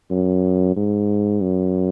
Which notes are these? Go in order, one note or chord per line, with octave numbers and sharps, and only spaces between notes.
F#2
G#2
F#2